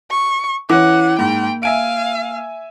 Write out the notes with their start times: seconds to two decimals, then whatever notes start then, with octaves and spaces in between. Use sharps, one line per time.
0.11 C#6
0.70 E3 C#4 E4 F#5 D6
1.19 G#2 A#3 G5
1.63 E5 F5 G#5 D7